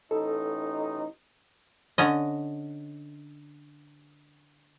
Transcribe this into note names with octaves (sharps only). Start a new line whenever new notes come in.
A1 D#4 A4
D3 C#4 D#5